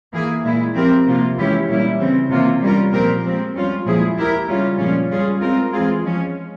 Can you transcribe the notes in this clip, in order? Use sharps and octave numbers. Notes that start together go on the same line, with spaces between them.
E3 A#3 E4 G#4
A#2 G#3 E4
F3 C4 G4 A#4
C3 F3 A#3 F4
E3 G#3 C#4 E4 G4
A#2 G3 C#4 E4
C#3 E3 G3 C4
C3 E3 A#3 C#4 F4
G3 C#4 F4 A#4
A#2 F3 C4 G4 A#4
F3 G#3 C4
G3 C#4 F4
A#2 F3 G#3 E4 G#4
G#3 E4 G4 A#4
C#3 G3 C#4 F4
A#2 F3 G#3 C#4 F4
G3 C#4 F4 G#4
G#3 C4 F4 A#4
E3 G#3 C4 F4 G#4
F3 G#3 C#4